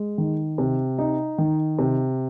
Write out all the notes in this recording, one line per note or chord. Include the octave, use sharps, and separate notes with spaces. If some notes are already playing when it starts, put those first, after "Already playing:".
Already playing: G#3
D#3
C3
D#4
D#3
C3